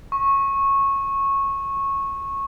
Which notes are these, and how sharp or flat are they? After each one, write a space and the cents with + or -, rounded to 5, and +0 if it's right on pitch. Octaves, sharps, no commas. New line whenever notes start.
C#6 -15